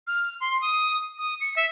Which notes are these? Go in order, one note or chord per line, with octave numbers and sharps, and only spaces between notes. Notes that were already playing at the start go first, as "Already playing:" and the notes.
F6
C6
D#6
D#6
C#7
E5